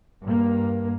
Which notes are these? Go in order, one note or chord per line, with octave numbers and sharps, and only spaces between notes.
G2 A#3